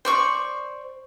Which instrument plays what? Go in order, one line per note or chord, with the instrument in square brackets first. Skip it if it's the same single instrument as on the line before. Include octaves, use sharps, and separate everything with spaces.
[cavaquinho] C5 D5 C#6